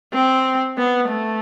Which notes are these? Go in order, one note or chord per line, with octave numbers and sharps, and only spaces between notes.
C4
B3
A3